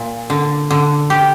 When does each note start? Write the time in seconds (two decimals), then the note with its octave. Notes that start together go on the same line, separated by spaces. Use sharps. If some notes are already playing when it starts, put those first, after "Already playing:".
Already playing: A#2
0.30 D3
0.71 D3
1.10 G4